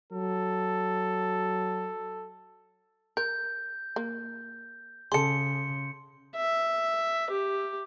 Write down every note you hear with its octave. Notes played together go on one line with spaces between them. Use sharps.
F#3 A4
A#4 G6
A#3
C#3 G#4 A4 C6 C#7
E5
G4